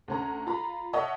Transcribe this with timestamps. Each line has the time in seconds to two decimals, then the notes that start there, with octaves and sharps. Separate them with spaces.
0.08 D2 C#4 A#5
0.47 F4 A#5 B5
0.93 C#5 D#5 E5 F#5 A5 E6